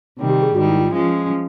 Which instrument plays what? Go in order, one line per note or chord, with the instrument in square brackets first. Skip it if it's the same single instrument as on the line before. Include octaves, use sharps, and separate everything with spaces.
[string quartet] C3 D#3 G3
[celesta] G4
G#4
[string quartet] G#2 D#3 G3 [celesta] F#4
[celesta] E4
F4
[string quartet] F3 G#3 C#4